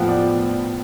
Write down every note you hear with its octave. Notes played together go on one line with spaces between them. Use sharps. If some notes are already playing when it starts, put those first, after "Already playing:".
Already playing: A2 F3 B3 G5
D5